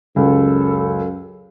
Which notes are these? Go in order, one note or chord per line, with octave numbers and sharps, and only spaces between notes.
C#2 F#2 A4